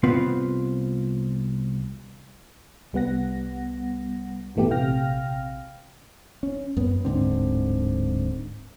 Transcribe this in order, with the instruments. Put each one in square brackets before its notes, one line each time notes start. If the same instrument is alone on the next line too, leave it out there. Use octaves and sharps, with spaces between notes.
[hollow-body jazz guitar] C2 B3 C4 F4 B4 F5
[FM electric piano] C2 G3 B3 F#5 A#6
A#1 G2 E3 A3 B3 G4
A#1 C3 F5 G5 F6 A#6
[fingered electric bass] C#4
F#2 B3
D1 G#2 D3 C4